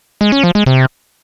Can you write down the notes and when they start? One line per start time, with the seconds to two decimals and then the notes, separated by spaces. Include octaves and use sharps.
0.21 G#3
0.32 C#4
0.44 F3
0.55 G#3
0.66 C3